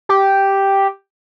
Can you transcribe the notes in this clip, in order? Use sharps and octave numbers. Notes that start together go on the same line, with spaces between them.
G4